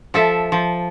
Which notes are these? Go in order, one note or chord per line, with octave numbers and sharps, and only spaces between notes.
F3 A4 E5
F3